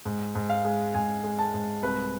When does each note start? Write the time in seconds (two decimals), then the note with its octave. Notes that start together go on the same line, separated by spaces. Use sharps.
0.05 G#2
0.35 G#2
0.50 F5
0.64 G#3
0.94 G#2 G#5
1.24 G#3
1.39 A5
1.54 G#2
1.83 C2 B4